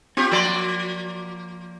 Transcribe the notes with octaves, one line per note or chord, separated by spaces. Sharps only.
B3 C4 F4 G4
F3 A#3 F#4 D5 B5 C6